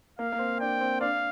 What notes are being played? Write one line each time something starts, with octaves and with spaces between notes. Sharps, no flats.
A#3 F5
A#3
C4
D4 G5
C4
D4 F5